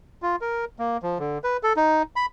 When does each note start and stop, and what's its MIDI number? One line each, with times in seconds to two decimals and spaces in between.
0.22 0.36 65
0.41 0.65 70
0.79 0.97 58
1.03 1.18 53
1.19 1.38 50
1.44 1.57 71
1.63 1.73 69
1.76 2.02 63
2.16 2.26 83